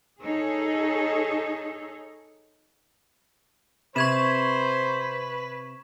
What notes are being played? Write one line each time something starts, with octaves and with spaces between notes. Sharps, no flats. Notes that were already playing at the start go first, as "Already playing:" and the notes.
D#4 G#4 A4 C#5
C3 B4 C5 C#6 G#6 E7